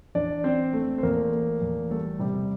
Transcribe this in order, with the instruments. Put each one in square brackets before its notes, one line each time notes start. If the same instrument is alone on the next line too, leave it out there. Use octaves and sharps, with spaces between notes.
[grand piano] E2 D4 D5
C4 C5
A3
C5
E2 A#3 A#4
A3
E2
G3 A3 A4
C3 G3 G4